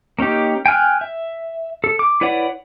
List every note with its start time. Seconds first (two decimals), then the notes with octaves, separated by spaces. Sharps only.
0.19 A#3 C#4 D#4 G4
0.66 G5 G#5 F6 F#6
1.01 E5
1.84 A4
1.99 D6
2.21 E4 B4 C#5 D5 F#5